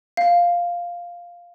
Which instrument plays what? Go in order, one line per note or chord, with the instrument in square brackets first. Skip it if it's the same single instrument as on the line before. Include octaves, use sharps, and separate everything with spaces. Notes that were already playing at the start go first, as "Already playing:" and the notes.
[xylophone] F5